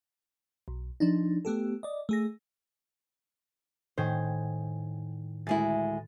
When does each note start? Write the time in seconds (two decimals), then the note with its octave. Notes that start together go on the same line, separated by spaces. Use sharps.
0.68 B1
1.00 F3 D4 D#4
1.45 A3 B3 G4 A4
1.83 D5 D#5
2.09 A3 G#4 A#6
3.98 A2 D#3 C5 G#5
5.47 D2 G#3 E4 A6